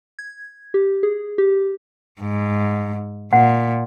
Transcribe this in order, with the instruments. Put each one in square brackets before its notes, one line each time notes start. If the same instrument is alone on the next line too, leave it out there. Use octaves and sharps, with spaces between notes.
[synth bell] G#6
G4
G#4
G4
[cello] G#2
[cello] A#2 [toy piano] F#5